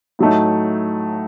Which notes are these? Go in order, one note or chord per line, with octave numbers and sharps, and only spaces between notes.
A2 F#3 A3 D#4